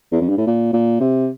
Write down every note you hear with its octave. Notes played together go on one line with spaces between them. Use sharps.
E2
F2
G2
A2
A#2
A#2
C3